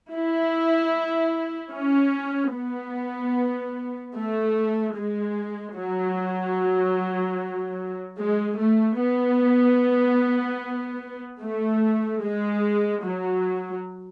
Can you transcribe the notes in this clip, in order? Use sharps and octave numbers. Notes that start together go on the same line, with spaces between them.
E4
C#4
B3
A3
G#3
F#3
G#3
A3
B3
A3
G#3
F#3